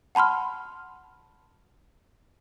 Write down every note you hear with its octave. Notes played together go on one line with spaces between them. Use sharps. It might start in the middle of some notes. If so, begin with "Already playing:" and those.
F#5 A5 B5 C6 F6